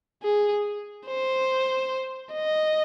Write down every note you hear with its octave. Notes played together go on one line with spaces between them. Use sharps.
G#4
C5
D#5